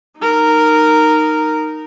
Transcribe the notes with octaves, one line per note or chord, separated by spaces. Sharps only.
D#4 A#4